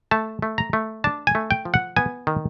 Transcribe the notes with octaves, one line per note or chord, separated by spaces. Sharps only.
A3 A5
A3
A#5
A3
D4 A5
G#5
A3
G5
F3
F#5
B3 G#5
D#3